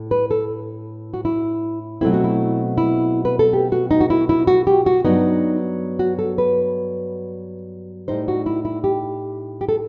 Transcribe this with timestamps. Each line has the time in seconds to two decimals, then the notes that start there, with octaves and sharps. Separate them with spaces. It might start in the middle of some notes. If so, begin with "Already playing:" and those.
Already playing: A2
0.11 B4
0.31 A4
1.14 F#4
1.25 E4
2.01 B2 F#3 A3 C4 E4
2.13 F#4
2.24 E4
2.78 E4
3.25 B4
3.39 A4
3.53 G4
3.72 F#4
3.91 D#4
4.01 F#4
4.10 E4
4.29 E4
4.47 F#4
4.67 G4
4.86 F#4
5.05 G2 F#3 B3 D#4
5.99 F#4
6.19 A4
6.38 B4
8.08 A2 G3 D#4 C5
8.28 F#4
8.46 E4
8.65 E4
8.84 G4
9.61 G4
9.69 A4